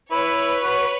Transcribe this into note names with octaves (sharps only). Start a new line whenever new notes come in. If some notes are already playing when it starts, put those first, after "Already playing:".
E4 B4 C#5
F#4